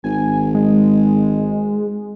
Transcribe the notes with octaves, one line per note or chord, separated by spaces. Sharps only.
G#1 G#5
G#3